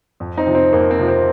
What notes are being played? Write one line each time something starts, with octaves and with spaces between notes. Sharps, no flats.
F2
C4 D#4
C3 F3
C4
F2 A#3
C4
C3 F3
C4